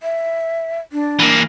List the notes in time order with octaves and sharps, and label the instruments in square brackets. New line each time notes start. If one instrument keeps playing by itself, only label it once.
[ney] E5
D4
[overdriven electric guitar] E3 A#3